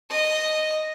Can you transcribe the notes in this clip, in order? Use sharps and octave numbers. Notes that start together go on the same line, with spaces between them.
D#5